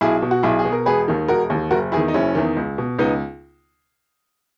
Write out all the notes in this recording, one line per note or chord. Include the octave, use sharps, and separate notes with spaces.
B1 E4 G#4
B2
F#4
B1 E4 G#4
G#4
B2
A#4
E1 G#4 B4
D#2 D#3
E1 F#4 A#4
D#2 D#3
F#1 F#4 A#4
E2 D#3 E4 G#4
D#4
F#1 C#4 E4
E2 D#3
C#2
B2
C#2 B3 D#4